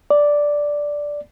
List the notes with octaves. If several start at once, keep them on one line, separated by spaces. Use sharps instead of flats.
D5